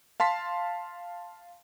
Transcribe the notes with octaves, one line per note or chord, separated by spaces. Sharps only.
F5 A5 C6 B6